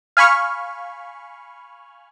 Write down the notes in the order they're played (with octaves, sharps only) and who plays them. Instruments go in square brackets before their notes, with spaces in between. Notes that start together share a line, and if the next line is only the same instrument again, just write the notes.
[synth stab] F5 G#5 B5 C#6 F6